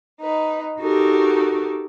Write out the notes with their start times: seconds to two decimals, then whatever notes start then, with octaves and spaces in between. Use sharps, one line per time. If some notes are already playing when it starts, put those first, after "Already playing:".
0.20 D#4 B4
0.79 D#4 F#4 G4 A4 A#4